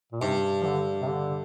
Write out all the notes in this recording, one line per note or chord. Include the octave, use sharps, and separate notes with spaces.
A#2
G2 C3
F3
D3
C3
D3